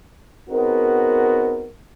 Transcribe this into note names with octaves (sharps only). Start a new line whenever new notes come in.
B3 C4 D#4 F#4 G#4 A#4